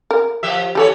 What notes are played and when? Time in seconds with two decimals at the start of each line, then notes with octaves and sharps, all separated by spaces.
0.11 A#4
0.43 F3 G4 E5
0.75 E3 G4 A4 C#5